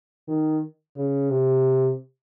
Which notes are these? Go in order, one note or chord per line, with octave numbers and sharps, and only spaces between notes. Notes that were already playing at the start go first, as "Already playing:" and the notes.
D#3
C#3
C3